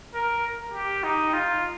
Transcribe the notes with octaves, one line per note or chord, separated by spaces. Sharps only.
A#4
G4
D#4
F4